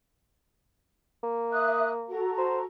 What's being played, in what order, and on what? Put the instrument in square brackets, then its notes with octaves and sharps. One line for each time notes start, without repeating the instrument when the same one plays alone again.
[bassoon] A#3
[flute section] E5 D#6 F#6
F#4 A4 A#5
[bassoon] C5